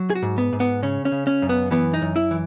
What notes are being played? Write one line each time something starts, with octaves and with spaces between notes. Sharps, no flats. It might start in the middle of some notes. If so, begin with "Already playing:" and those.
Already playing: F#3
G#4
F#4
G#2
B3
G#2
B3
C#3 C#4
C#4
C#3
C#4
F#2
B3
E3 B3
D#4
F#2
E4
E3